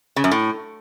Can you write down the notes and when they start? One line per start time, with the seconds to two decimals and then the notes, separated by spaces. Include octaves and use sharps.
0.16 C#3
0.24 F#2
0.31 A2